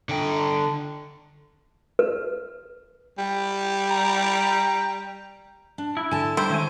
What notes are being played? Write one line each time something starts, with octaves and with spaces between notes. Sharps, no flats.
D3 G5
B4
G3
A#5
D4
E4
D3 G#5 A5
G3 E4 C5
D#3 G#3 C#4 G#5